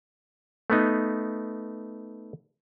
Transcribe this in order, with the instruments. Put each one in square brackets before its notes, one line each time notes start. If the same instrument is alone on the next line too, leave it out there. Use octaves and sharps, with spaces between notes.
[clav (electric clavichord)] A3 B3 D#4